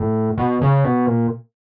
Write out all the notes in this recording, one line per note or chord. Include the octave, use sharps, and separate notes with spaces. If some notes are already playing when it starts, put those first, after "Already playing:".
Already playing: A2
B2
C#3
B2
A#2